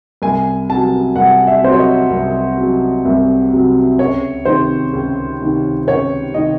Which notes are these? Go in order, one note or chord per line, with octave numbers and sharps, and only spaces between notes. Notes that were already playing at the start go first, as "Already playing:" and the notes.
C2 G#5
C3 F#3 A5
C2 F#5
E5
C3 F#3 C5
C#5
D#5
C2
C3 F#3
C2
C3 F#3
C#2 C#5
C3 D#3 C5
C#2
C3 D#3
C#2 C#5
C3 D#3 D#5